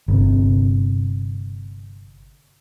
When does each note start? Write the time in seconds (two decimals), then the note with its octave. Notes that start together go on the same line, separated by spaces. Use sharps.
0.08 G1 C3